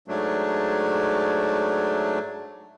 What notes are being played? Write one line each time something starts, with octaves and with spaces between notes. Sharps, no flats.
G#2 F#3 A3 D4